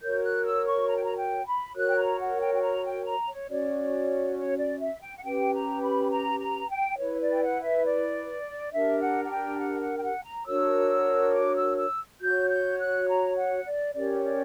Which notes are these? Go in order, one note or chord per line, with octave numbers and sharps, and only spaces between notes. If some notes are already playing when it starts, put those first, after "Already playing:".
F#4 A#4 C#5 G6
F#6
E6
C#6
A#5
G5
A#5
G5
B5
F#4 A#4 C#5 F#6
G5
A#5
F#5
G5
G5
A#5
G5
A#5
C#5
C#4 F#4 C#5 D5
C#5
D5
E5
G5
F#5
C#4 G4 B4 G5
A#5
B5
A#5
A#5
G5
E4 B4 C#5
D5
G5
F#5
E5
D5
D4 G4 A#4 E5
F#5
F#5
G5
F#5
F#5
G5
F#5
A#5
D4 F#4 A#4 C#5 E6
D6
E6
E6
F#4 C#5 G6
G6
F#6
A#5
F#5
D5
C#4 G4 A#4 C#5 D5
D5